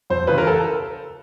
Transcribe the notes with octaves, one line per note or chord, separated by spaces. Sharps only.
F2 C5
C#3 E3 B4
A#4
A4